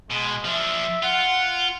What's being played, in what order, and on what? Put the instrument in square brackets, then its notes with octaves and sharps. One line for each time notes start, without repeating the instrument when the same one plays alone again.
[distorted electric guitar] B2 [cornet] G#3
[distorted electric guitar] F3 D4 [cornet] E5
[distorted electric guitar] F4 [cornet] F#5